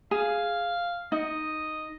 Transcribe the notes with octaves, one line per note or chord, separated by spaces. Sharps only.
G#4 F5
D#4 D#5